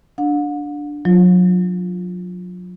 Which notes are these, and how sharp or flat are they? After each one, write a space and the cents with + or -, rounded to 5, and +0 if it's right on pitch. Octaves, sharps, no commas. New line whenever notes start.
D4 +0 F#5 -45
F#3 -35 F4 +0